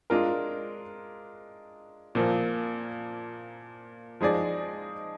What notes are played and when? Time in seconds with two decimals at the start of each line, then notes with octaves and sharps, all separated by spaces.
0.10 G#3 D4 F4 A#4
2.15 A#2 F3 A#3
4.21 F3 G#3 D#4 G#4 D5